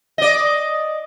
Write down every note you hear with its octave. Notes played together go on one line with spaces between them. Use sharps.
D5 D#5